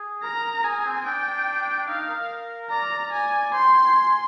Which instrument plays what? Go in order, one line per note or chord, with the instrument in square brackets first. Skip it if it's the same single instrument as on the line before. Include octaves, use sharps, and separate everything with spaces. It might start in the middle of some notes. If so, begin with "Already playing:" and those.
Already playing: [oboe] G#4
[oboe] A#4 [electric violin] A#5
[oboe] A#4
[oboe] G#4 [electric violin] G#5
[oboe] C4
[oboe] D4 [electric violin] G5
[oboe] D#4 [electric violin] F5
[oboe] A#4
[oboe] D5 [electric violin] A#5
[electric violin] G#5
[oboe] C5 [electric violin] C6
[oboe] G5
G5
G#5
G#5